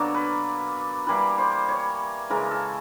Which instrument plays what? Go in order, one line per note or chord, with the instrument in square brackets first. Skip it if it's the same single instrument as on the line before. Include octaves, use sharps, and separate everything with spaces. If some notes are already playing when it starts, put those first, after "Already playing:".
Already playing: [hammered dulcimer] B2 F#3 A#3 D4 A4
B4
E3 G3 A#3 B4
C5
C#5
C#3 E3 G#3 A#4
A4